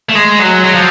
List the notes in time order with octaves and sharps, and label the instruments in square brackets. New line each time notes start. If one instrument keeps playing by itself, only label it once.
[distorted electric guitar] A3
G#3
F#3
F#3
F3